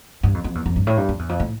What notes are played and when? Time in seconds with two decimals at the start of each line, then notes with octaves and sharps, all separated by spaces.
0.23 G2
0.34 F2
0.44 F2
0.55 E2
0.66 F2
0.76 G2
0.87 A2
0.97 G2
1.09 F2
1.19 E2
1.29 F2
1.40 A2